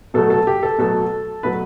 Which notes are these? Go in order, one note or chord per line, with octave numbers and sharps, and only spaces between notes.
B2 F#3 A3 A4
A4
G4
A4
B2 F#3 A3 A4
B2 F#3 A3 B4